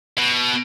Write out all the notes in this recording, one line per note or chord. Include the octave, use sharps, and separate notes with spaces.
B2